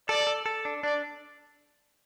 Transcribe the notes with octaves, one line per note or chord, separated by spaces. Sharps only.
A4 D5
A4
A4
D4
D4 D5